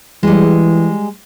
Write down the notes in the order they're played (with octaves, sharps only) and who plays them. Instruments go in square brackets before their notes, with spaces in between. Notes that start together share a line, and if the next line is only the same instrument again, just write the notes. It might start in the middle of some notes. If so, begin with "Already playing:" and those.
[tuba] E3 [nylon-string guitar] G3 G#3